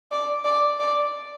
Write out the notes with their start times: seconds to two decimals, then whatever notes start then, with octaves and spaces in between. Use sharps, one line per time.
0.12 D5
0.45 D5
0.80 D5